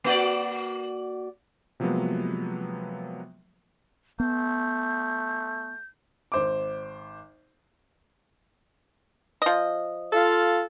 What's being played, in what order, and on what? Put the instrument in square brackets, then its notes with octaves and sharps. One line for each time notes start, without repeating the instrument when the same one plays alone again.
[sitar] A#3 F#4 D5
[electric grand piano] C3 F3 F#3 G#3 A#3 B3
[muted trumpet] A3 [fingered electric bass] B3 [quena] G6
[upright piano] G#1 C5 D6
[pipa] F3 D#5
[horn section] F4 A4 F5